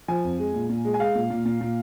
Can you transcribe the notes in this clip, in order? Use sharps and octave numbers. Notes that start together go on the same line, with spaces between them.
F3 G#5
F2
G#3
A#2
A#2
G#3
G#5
G#3 F5
A#2
A#2
A#2
A#2